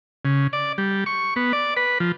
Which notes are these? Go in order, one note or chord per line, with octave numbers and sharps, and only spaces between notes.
C#3
D5
G3
C#6
B3
D5
B4
F3